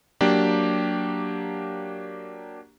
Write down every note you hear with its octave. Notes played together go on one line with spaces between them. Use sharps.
F#3 A#3 D4 G4